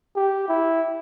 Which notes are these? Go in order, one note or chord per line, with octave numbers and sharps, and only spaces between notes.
G4
E4